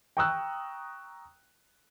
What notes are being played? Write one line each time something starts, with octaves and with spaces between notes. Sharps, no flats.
G5 A#5 C#6 D#6 E6 F#6